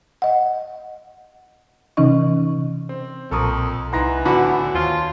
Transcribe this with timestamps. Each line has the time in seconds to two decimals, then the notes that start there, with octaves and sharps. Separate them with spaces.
0.22 D#5 F#5
1.97 C3 E3 C#4 D#4 D#5 C#6
2.89 C4
3.31 B1 F2 A#2 A4 A#4 C#6 D#6
3.93 C2 E3 D#4 F#5 A#5 C6 A#6
4.25 A2 D3 B3 F#4 B5
4.75 D#2 F4 C5 C#5 G#5 A5 F6